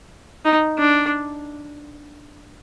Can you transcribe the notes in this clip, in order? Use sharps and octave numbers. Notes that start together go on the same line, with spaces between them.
D#4
D4